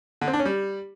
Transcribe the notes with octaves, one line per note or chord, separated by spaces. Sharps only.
D3
C4
D4
C#4
G3